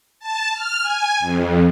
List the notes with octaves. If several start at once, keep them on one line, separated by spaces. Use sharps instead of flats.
A5
F6
G#5
F2